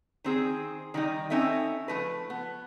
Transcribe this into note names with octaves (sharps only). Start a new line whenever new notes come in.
D#3 C4 G#4
D#3 G3 D#4
C4 C#4 D#4 A4 E5 G5
F3 A3 B4
B3